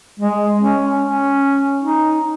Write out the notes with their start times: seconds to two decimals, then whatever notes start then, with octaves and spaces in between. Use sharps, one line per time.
0.20 G#3
0.61 C#4
1.01 C#4
1.83 D#4